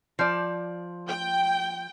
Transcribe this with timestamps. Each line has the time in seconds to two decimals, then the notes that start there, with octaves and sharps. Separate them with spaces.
0.19 F3 D5
1.08 G5